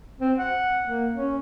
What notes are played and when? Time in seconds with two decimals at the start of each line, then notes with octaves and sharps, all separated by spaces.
0.20 C4
0.38 F#5
0.86 A#3
1.14 C#4